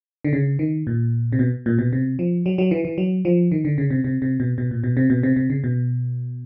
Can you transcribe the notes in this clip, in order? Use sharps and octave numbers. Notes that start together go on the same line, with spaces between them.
D3
C#3
D#3
A#2
C3
B2
A#2
B2
C3
F3
F#3
F#3
E3
E3
F#3
F3
D#3
D3
C#3
C3
C3
C3
B2
B2
A#2
B2
C3
B2
C3
C3
C#3
B2